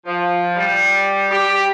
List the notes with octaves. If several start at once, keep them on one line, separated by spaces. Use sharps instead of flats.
F3
G3
G4